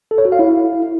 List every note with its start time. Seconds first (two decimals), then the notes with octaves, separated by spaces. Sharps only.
0.11 A4
0.18 C#5
0.25 F#4
0.32 F5
0.39 E4